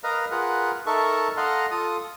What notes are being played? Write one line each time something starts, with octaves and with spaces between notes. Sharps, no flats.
A#4 B4 D#5 F5 A#5
F4 G#4 A#4 B4 F#5
D#4 A4 A#4 E5 A5 C#6
A4 D#5 F5 F#5 A#5 C6
F4 A4 D#6